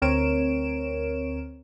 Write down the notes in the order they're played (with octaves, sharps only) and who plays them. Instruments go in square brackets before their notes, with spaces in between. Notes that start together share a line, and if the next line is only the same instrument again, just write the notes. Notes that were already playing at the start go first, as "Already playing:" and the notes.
[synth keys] D2 C4 A#4 C#5 D7 E7